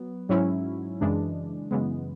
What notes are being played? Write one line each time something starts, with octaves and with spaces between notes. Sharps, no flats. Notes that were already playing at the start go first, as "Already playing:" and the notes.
Already playing: F#3 B3
G#2 F#3 C#4 E4
F#2 C#3 E3 G#3 D4
F#2 C#3 E3 G#3 B3